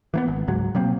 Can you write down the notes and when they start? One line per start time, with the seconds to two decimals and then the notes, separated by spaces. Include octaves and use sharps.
0.14 E3 A#3 B3
0.28 G#1
0.48 C#2 G#2 F#3
0.75 B2 F#3 A#3 C4